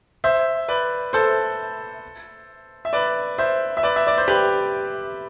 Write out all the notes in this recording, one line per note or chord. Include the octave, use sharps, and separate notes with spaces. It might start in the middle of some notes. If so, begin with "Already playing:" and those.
C5 E5
B4 D5
A4 C5
E5
B4 D5
C5 E5
E5
B4 D5
E5
D5
C5
G4 B4